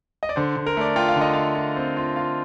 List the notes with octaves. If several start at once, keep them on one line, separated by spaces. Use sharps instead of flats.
D#5
D5
D3 C5
D3
A#4
A3 D5
F4 G5
F5
D3
D#5
A3 F5
F4
C4
F4
F4 F5